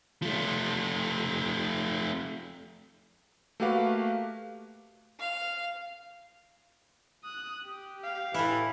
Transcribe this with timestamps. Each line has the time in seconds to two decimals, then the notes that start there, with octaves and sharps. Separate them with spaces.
0.22 F3 A3
3.60 A3 A#3 F#4 G4 B4 F5
5.19 F5
7.24 D#6 F#6
7.66 G4
8.03 F5
8.34 A2 E3 E4